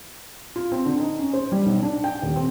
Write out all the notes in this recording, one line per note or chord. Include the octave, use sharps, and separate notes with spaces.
F4
C4
D3
D#4
C#4
C5
G3
B1
D4
G5
D#1
C4